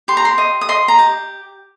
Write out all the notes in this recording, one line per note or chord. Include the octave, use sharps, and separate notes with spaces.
G4 C6
A#5
C6
D#5
D#6
D#5 C6
A#5
G4